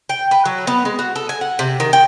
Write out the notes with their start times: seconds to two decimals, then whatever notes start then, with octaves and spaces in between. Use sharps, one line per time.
0.09 G5
0.31 B4
0.45 F#3
0.67 B3
0.85 G#3
0.99 F#4
1.16 A4
1.29 G#5
1.41 F#5
1.59 C3
1.80 D#3
1.93 G5